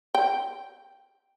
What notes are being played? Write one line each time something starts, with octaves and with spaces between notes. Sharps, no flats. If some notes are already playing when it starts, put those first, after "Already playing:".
G5